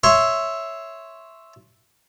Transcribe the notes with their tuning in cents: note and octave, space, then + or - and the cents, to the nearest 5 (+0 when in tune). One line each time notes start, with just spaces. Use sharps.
C#5 +0 E5 +0 C6 +0